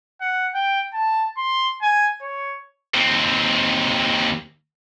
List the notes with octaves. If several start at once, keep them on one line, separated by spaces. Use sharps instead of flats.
F#5
G5
A5
C6
G#5
C#5
D#2 C4